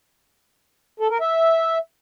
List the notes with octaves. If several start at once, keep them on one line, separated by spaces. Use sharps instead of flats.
A4
A#4
E5